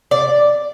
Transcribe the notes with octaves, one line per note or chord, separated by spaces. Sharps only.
D5